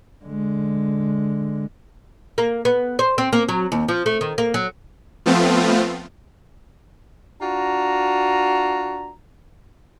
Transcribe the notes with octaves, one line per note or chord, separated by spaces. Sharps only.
D3 G#3
A#3
B3
C5
C4
A#3
F#3
D#2
F3
A3
D#3
A#3
F#3
F3 A3 B3 C4 F4
D4 F4 F#4 A#5